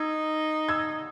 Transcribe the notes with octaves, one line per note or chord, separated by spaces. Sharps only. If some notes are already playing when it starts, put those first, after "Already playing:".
Already playing: D#4 E6 G#6
E6 G#6